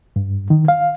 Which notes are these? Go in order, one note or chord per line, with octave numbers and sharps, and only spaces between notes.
G2
D#3
F5